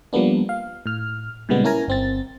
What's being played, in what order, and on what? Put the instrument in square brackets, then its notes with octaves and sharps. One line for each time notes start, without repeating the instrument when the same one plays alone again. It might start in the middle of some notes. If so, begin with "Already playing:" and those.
[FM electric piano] F3 G3 A#3 B3 D4
F5
A2 F6
A#2 C#3 G3 G#3 B3
C#4 E4 A#4 G#5 A#5
G1 C4 A6